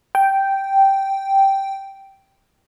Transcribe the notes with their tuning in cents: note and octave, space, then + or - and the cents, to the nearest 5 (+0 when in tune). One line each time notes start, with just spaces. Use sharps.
G5 -5